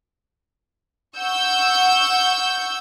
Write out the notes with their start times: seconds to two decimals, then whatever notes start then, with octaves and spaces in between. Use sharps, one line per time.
1.18 F#5 C#6 E6 G6